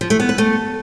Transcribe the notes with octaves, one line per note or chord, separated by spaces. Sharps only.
F3
A3
B3
B4
A3